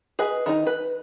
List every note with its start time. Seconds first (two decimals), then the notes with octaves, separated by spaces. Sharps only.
0.19 G#4 B4 D#5
0.46 D#3 D#4
0.67 B4